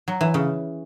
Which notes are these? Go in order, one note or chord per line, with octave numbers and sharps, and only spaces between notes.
F#3
E3
C#3